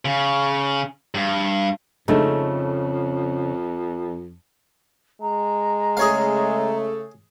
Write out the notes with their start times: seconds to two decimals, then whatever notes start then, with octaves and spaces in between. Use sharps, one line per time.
0.05 C#3
1.15 G2
2.08 F2 C#3 G#3 A3 D#4
5.22 G#3 A#5
5.97 C#3 A3 G#4 C#5 F5